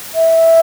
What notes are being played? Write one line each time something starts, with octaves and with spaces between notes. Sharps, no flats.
E5